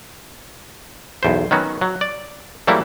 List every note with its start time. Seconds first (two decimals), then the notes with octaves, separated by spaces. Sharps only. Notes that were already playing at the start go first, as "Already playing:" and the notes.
1.23 B1 E2 C5
1.51 D#3 F#3 B3 C#4 F#4
1.81 F#3
2.01 D5
2.67 E3 F#3 G3 A3 A#3 E4